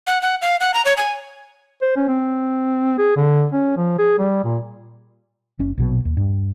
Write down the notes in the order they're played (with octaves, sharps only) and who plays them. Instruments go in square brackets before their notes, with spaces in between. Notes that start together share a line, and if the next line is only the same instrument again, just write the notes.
[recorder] F#5
F#5
F5
F#5
A#5
C#5
G#5
[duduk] C5
C#4
C4
G#4
D3
C#4
F3
G#4
G3
A#2
[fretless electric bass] F#1 C#4
A#1 B2 F#3
D#2
G2